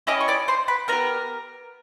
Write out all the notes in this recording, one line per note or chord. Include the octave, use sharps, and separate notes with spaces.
C#4 E4 G4 D#5 D#6
C#6
D5 D6
C5 C6
B4 B5
B3 E4 G4 A#4 A#5